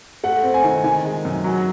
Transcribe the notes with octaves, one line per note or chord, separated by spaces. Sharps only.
A3 F#5
C4
G#5
D#3
D#3 G#5
G#3
F#2
F#3